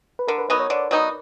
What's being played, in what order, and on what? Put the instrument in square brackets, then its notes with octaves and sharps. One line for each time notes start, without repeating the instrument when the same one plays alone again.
[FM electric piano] B4
[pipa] D3 [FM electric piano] A#4
[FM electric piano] B4
[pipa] F#3 B3 D#4 [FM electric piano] B4
[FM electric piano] C#5
[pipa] D3 [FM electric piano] D5
[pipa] F#3 B3 D#4